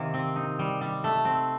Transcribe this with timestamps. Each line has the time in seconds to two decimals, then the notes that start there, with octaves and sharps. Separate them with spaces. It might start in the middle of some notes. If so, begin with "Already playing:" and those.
Already playing: C3 D#3 A#3
0.14 C4
0.36 D#4
0.59 G3
0.81 G3
1.04 A3
1.25 C4